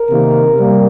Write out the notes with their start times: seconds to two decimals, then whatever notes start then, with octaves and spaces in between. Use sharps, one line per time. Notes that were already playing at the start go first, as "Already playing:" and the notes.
Already playing: A#4
0.10 C3 D#3 A#3
0.54 C3 G3 A#3